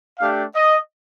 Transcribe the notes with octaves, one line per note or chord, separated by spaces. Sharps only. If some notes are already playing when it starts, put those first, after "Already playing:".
A3 D4 G4 F5
D#5